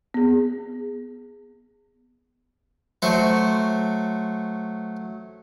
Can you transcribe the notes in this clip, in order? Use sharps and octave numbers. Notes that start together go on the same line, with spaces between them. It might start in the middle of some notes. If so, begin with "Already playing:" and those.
B3 G#4
F#3 A3 C5 C#6